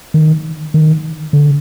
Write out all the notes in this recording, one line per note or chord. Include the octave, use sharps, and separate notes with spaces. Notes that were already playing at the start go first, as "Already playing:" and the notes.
D#3
D#3
D3